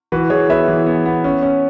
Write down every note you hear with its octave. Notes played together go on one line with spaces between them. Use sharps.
E3 F#4 B4
E3 G#4 C#5
B3 B4 E5
E3
B3
B3
C#4
C#4